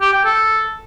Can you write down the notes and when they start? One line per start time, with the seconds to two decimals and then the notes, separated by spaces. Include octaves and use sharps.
0.01 G4
0.13 G5
0.24 A4